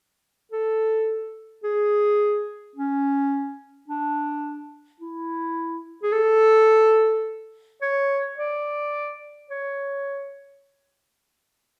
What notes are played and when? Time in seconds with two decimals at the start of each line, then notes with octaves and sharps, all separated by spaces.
0.51 A4
1.64 G#4
2.75 C#4
3.88 D4
5.00 E4
6.03 G#4
6.12 A4
7.82 C#5
8.38 D5
9.50 C#5